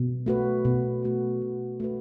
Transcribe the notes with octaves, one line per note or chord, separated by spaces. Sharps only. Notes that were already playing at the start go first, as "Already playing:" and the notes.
Already playing: B2
A3 F#4 B4
B2
A3 F#4 B4
B2
A3 F#4 B4